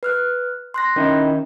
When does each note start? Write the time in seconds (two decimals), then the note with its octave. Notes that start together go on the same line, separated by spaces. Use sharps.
0.03 B4 F6 F#6
0.74 C6 F#6 A#6
0.96 D#3 C#4 D#4 E4